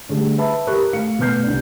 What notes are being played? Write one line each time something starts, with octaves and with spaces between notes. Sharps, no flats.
D3 G3 A3 G#4
B4 E5 A5 B5
G4 A#4 B5 C#6 F#6
A3 F5 C#7
B2 A3 B4 F6 G6 C7
C2 D4 D5